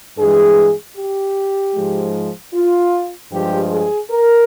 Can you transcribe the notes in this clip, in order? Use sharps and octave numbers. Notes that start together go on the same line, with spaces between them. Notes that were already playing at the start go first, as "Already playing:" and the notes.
G2 E3 G#3 G#4
G4
G#2 F3 G#3
F4
G2 F3 G#3 G4
G#4
A#4